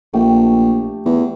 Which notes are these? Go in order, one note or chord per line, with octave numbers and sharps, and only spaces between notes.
A#1 A3 G4 G5
E2